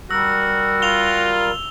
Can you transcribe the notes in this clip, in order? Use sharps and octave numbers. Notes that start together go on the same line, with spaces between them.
G3 F#4 A#4 E6
F4 F7 G7